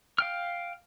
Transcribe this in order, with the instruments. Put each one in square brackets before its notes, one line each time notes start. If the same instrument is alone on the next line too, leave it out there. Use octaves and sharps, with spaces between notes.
[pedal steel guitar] F5 G5 F6